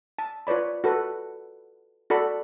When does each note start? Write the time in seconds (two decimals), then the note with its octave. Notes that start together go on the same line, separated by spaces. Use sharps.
0.19 A5
0.47 F4 B4 C#5 D5 B5
0.84 F#4 A4 B4
2.10 F#4 A4 D5 B5